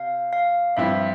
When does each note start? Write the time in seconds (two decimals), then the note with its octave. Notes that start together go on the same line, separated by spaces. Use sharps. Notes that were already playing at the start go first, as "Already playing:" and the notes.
Already playing: C3 F5
0.33 F5
0.77 G2 F3 C4 E4 E5